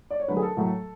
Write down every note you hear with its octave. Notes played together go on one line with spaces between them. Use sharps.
D5
C#5
D3 F#3 A3 B4
G#4
A4
A2 F#3 A3